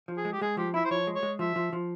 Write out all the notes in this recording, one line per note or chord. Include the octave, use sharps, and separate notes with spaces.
F3
G#4
G#3
G4
G#3 G#4
F3 G4
E4 E5
C5
F3 C#5
G#3
C#5
G#3
F3 E5
F3
F3